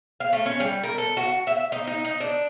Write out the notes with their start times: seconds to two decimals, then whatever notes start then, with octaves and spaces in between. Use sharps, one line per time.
0.20 F5
0.33 A3
0.46 C#4
0.60 G3
0.84 A#4
0.98 A4
1.17 F#4
1.47 E5
1.72 D#4
1.87 D#4
2.05 D#4
2.20 D4